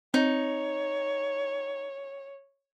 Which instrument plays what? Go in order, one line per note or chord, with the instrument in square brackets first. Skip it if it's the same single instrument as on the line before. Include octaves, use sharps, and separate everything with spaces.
[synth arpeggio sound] C4 [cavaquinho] D#4 [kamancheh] C#5